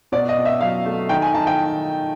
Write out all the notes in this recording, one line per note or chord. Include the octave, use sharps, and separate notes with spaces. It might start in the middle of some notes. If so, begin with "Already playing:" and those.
B2 D5
D#5
B2
E5
F#3 F5
A3
D#3 G5
G#5
D#3 A5
G5